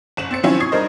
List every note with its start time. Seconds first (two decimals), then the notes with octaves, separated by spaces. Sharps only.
0.17 F#1 E7 F#7
0.31 C4 A6 C#7
0.43 D#3 F3 F#3 C4 C#4 E4
0.60 C#6 D#6 G#6 C7
0.72 G3 D4 D#4 A#4 C5 D#5